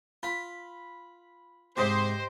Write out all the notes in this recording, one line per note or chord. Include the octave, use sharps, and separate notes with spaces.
F4 B5
G#2 C3 G4 C5 D#5 C6